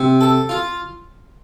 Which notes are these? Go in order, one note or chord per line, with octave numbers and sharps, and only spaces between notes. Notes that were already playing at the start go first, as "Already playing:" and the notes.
Already playing: C3
A4
F4